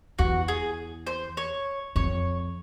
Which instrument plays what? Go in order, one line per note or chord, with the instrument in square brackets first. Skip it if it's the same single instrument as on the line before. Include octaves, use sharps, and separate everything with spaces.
[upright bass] E2 [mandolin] F#4
[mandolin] G#4
C5
C#5
[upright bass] F2 [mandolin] C#5